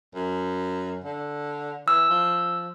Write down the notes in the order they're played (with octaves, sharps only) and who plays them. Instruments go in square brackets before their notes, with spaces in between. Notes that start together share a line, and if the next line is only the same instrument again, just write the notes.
[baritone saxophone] F#2
D3
[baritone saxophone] E3 [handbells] E6
[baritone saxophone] F3